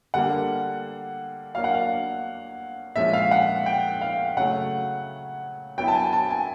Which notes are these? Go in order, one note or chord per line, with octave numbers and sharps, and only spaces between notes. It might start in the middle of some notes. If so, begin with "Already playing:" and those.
D3 G3 A#3 F#5
F#3 A#3 D4 F5
F#5
F5
A#2 F3 G#3 C#4 E5
F5
F#5
G5
F5
C#3 F#3 A3 F#5
F#3 B3 E4 G5
A5
G#5
A5
G#5